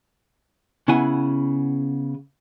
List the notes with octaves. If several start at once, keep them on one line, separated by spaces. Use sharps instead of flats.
C#3 B3 E4 F#5 G#5